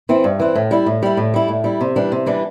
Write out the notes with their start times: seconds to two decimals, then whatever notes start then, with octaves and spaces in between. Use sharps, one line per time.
0.09 E3 C4 E4
0.24 G2
0.40 E3 C4 E4
0.55 A2
0.71 G3 E4
0.86 A2
1.03 G3 E4
1.17 A2
1.34 G3 E4
1.48 A2
1.64 G3 E4
1.81 C3
1.96 E3 G3 D4
2.12 C3
2.26 E3 G3 D4